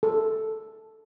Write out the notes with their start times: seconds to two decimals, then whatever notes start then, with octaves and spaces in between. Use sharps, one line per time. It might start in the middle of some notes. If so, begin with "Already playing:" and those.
0.03 A4